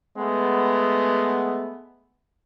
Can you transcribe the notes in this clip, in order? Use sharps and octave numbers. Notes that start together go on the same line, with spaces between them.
G#3 A3 B3